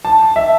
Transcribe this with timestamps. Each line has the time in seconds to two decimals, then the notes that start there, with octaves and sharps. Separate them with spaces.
0.05 A5
0.36 E5